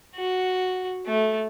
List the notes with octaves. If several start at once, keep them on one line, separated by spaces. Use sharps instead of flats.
F#4
A3